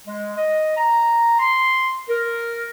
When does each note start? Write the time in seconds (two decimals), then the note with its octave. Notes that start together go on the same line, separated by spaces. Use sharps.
0.06 G#3
0.37 D#5
0.77 A#5
1.39 C6
2.09 A#4